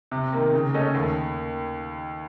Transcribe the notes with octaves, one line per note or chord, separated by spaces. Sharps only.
C3
D#3 A#3
C#3
A3 C#4 A4 D#5
D#2